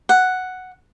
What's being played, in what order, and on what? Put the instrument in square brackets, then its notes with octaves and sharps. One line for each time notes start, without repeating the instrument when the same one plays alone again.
[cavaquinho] F#5